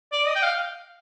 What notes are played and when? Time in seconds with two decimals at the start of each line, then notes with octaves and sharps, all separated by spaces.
0.12 D5
0.27 D#5
0.36 G5
0.43 F5